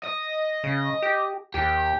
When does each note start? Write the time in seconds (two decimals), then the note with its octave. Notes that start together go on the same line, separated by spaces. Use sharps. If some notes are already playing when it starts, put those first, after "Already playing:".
0.04 D#5
0.64 C#3
1.02 G4
1.54 D#2 G4